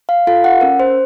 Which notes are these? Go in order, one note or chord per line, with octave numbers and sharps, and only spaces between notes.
F5
F4 A4 F5
F#5
C#4 A#4
C5